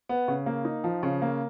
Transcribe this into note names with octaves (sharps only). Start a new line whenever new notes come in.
B3
C#3
A#3
D#4
F3
C#3
A#3